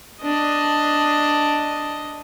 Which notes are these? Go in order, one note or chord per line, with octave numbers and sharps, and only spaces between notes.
D4 D#5